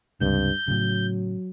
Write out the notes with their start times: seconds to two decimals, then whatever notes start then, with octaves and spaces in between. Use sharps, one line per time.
0.21 C#2 G2 C3 G6
0.68 A2 C#3 F#3